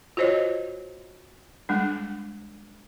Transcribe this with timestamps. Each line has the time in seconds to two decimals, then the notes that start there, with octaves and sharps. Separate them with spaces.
0.17 F4 F#4 C5 C#5 D#5
1.69 G3 G#3 D4